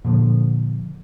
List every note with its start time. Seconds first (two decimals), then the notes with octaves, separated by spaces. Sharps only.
0.04 A#2 D3 F3